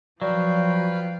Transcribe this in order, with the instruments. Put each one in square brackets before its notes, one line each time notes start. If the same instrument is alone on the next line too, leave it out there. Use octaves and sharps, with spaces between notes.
[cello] F3 [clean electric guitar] F#3 [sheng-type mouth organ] B4 F5 G5 [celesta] D5